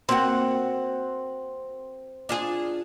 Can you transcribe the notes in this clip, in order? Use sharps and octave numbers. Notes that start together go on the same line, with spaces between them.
A#3 C4 F#4 F#5
D4 F4 G#4